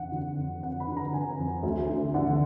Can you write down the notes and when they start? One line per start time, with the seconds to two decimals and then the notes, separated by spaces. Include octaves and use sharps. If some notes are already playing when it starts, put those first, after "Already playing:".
Already playing: F2 D3 F#5
0.12 D3
0.37 F2
0.63 F2 F#5
0.80 B5
0.88 D3
0.97 A#5
1.14 D3 G#5
1.38 F2
1.63 D2
1.89 D3
2.14 D3 F#5